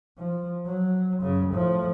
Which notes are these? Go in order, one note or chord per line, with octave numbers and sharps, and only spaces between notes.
F3
F#3
F#2 C#3
A2 F3